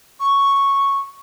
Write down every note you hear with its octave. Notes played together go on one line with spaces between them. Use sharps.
C#6